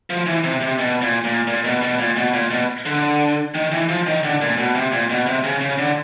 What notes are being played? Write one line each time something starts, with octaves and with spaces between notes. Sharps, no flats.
F3
E3
C3
C3
B2
A#2
A#2
A#2
B2
B2
A#2
B2
A#2
B2
D3
D#3
E3
F3
D#3
D3
A#2
B2
C3
A#2
B2
C3
C#3
C#3
D3